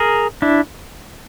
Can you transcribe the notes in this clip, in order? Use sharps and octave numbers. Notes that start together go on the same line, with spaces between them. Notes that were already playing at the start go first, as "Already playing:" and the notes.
Already playing: G#4 A#4
D4 E4